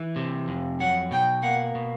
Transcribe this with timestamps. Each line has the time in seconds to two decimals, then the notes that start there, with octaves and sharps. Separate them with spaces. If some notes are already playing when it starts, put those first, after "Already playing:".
Already playing: E3
0.16 C3
0.48 F2
0.80 F#3 F#5
1.11 B2 G5
1.43 A#3 F#5
1.75 B2